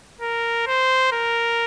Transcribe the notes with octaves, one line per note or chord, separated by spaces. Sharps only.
A#4
C5
A#4